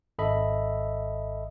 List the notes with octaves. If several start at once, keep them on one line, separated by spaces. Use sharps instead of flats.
G#1 A4 D#5 E5 B5